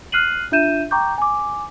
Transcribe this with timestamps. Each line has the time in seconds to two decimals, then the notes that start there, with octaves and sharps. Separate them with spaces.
0.12 F6 F#6 C7 D#7 F#7
0.52 D4 F4 E5 G6 D#7 E7
0.91 G5 A#5 C#6 D6 G6
1.18 G#5 D6